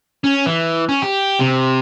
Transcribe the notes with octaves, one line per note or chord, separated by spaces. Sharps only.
C#4
E3
C#4
G4
C3